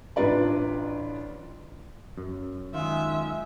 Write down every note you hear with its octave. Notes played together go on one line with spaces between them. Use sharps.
A1 D4 F4 B4 D5 A#5
F#2
D#3 G#3 F4 E5